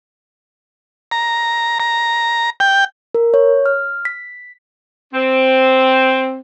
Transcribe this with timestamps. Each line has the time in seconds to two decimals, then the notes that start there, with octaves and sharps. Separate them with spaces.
1.12 A#5
1.80 A#5
2.60 G5
3.15 A#4
3.34 C#5
3.66 F6
4.05 B6
5.14 C4